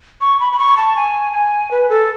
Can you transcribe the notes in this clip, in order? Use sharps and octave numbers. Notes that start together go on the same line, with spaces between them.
C#6
B5
B5
C#6
A5
G#5
G#5
B4
A4